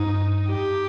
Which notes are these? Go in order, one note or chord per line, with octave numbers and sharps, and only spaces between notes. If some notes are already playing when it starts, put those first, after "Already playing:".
Already playing: G2 D#4
G4